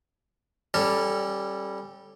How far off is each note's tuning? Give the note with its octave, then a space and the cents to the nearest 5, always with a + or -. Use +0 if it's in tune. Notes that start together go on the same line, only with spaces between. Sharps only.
G3 +0 C#4 -25 A4 +0